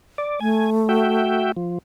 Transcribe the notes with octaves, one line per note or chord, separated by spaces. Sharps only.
D5
A3 G#5
F#4 E5 G5
F3